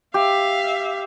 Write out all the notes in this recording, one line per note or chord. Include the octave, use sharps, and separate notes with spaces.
G4 E5 F5